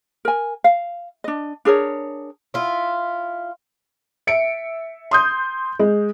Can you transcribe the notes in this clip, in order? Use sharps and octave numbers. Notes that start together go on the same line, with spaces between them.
A#4 G#5
F5
D4 D#5
D4 G#4 A#4 C#5
E4 F4
E5 C#7 D7
C6 D#6 G6
G#3